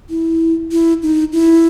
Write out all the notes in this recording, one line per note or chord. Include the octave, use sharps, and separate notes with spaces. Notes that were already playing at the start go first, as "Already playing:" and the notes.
E4
E4
D#4
E4